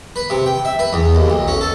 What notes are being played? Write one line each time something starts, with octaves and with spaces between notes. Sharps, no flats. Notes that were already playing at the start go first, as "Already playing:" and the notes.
B4
C3
G5
E5
B4
E2
D#2
B1
C#4
A4